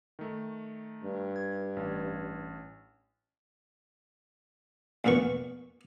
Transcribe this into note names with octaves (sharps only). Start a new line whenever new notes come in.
D#3 A3
G2
G#6
A1
A#1 F2 A#2 B3 C#6